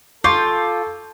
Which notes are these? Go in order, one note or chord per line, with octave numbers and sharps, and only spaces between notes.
F4 A4 C#6 D6 G6